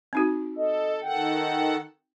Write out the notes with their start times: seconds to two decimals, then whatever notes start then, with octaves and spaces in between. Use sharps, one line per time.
0.13 C4 D#4 F#4
0.56 A4 D#5
1.02 D#3 A4 F#5 G5